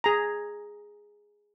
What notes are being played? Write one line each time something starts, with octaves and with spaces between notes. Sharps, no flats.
G#4 A#5